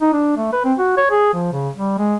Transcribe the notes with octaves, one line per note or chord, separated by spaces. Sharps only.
D#4
D4
A3
B4
C4
F#4
C#5
G#4
F3
C#3
G3
G#3